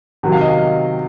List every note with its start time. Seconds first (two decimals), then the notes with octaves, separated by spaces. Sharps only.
0.23 C3 D#3 F#3 F#5
0.32 F5
0.41 D#5
0.50 F5